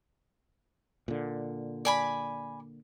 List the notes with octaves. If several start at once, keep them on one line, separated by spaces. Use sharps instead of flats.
A#2 D3
D5 G#5 B5